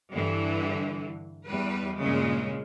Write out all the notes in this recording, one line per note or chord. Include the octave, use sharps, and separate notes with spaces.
G2 D3 E3
E2 G3 B4
G2 A#2 C#3 G#3